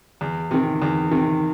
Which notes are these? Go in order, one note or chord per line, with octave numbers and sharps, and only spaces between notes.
E2
C3 D#3
E2
C3 D#3